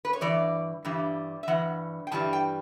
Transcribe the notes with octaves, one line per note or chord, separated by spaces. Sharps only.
B4
C#5
G2 E3 D5
G2 E3 G3
E5
G2 E3 F#5
G5
G2 E3 G3 A5
G5